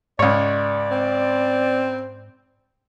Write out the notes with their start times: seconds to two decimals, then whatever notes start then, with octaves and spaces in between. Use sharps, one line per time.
0.19 C#2 G#2 C#5 D5
0.91 C4